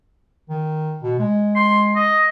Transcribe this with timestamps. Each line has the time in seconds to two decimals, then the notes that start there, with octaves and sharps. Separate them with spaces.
0.50 D#3
1.03 B2
1.19 G#3
1.55 C6
1.96 D#5